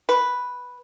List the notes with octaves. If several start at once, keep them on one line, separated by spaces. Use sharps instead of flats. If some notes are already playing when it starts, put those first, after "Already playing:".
B4